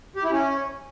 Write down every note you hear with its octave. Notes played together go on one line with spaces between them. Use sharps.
G4
E4
C#4